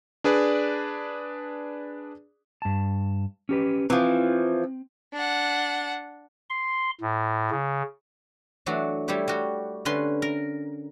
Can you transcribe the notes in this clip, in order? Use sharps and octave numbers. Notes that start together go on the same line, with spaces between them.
D4 G#4 B4 D5
G2 A5
C#4 G4 B4
E3 F3 C4
D4 F#5
C6
A2
C#3
E3 F#3 A3 D4 F#4
G3 A3 E4 G4 C#5
G3 F#4
D3 C#4 B4 C6
A#4